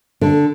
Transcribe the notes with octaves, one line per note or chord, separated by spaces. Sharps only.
D3